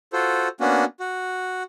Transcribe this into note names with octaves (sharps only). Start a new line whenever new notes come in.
F4 F#4 A4 C5
A#3 B3 C#4 D4 F#4
F#4